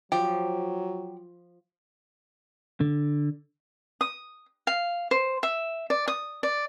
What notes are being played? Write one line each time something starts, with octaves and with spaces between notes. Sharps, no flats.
F3 F#3 G4
D3
D#6
F5
C5
E5
D5
D#6
D5